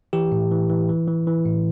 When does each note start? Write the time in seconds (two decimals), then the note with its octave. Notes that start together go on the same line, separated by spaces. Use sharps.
0.13 E3 G4
0.32 A2
0.51 E3
0.70 E3
0.89 E3
1.08 E3
1.27 E3
1.46 A2